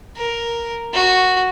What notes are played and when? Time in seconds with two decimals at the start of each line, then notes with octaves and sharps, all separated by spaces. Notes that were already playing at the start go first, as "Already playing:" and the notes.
0.16 A#4
0.93 F#4